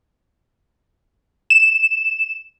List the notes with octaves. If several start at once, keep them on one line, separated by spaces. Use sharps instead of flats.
E7